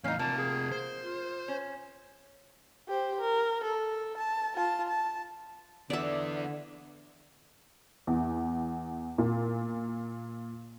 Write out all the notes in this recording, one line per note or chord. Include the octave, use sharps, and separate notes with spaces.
E2 A2 C#4 D#4 F5
C3 A#3 F4 A5
G#4
C5
F4
C#4
G4 C5
A#4
A4
A5
F4 A5
A5
D3 E3 B3 D5 E5
E2
A#2